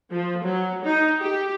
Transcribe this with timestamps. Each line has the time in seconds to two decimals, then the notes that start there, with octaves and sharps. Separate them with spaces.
0.11 F3
0.43 F#3
0.83 D#4
1.19 G4